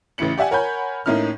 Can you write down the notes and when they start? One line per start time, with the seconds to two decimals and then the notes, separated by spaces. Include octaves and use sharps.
0.18 A1 A2 C#3 E3 C#7 F#7
0.38 G4 D5 E5 F#5 G#5
0.51 A#4 C#5 F#5 G#5 B5 G6
1.06 A2 A#3 C#4 D#4 E4 F6